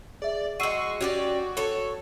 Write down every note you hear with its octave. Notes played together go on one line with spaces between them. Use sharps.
G#4 D5 E5
G#3 F#4 C#6 E6 C7 D#7
C#4 F#4 G4 D5
A4 C#5